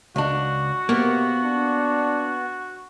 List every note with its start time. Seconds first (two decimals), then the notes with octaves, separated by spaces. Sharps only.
0.16 C#2 D4 F#4
0.89 C3 A#3 B3
1.43 D4